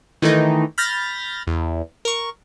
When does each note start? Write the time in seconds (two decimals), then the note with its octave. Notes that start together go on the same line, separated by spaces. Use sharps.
0.22 D#3 E3 A3 D#4
0.78 B5 F6 G6 A6 A#6
1.47 E2
2.05 A#4 C#6